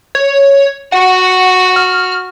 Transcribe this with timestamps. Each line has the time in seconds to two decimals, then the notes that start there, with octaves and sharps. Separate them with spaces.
0.15 C#5
0.92 F#4 F#5
1.76 F6